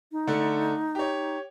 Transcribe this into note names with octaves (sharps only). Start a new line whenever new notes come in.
D#4
D3 A3
G4 C#5